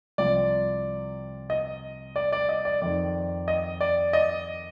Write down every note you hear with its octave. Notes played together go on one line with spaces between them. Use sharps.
C2 C3 F3 D5
D#5
D5
D5
D#5
D5
F2 D#3 D5
D#5
D5
D#5